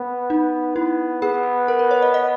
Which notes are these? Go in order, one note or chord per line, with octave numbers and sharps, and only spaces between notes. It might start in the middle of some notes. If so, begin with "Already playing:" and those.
Already playing: B3
D#4
B3 E4
B3 G#4
A#4
B4
C#5
D#5
D#5